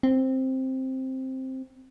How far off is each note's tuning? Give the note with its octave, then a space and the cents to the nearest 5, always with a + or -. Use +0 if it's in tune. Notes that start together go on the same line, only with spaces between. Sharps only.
C4 +5